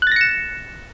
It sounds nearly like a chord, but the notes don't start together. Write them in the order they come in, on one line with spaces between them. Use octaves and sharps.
F#6 A6 A#6 C#7 E7